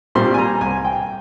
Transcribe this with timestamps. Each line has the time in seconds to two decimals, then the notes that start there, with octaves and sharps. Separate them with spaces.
0.15 A#2 G3 C4 C6
0.34 G#5
0.38 A#5
0.61 C2 G#5
0.85 G5